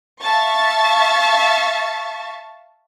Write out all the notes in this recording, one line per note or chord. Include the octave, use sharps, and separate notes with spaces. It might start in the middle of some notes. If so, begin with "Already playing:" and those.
E5 F5 A5 C#6 A6